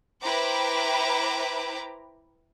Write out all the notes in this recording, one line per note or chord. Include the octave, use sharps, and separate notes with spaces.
E4 B4 C5 G5 A#5 D6